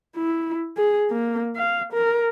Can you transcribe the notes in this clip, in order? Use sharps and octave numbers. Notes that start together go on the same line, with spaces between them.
E4
G#4
A#3
F5
A#4